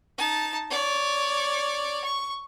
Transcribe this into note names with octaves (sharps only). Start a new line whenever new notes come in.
D#4 A5
C#5 D5
C#6